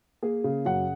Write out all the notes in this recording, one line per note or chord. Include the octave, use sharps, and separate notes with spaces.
A#3 G#4
C#3
F#2 F#5